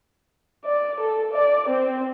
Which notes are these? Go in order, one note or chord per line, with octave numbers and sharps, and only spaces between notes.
D5
A4
D5
C4